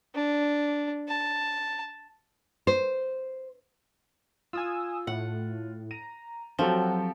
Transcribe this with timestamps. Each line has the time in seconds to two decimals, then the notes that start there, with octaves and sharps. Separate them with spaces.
0.15 D4
1.08 A5
2.67 C5
4.53 F4 G#5 D#6 E6
5.07 A2 F#5
5.91 A#5 D#7
6.59 F3 F#3 C4 F#4 G4 A4